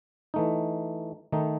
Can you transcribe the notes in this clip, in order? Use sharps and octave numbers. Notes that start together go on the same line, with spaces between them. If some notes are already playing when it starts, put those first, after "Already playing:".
E3 A3 D#4
D#3 A3 D#4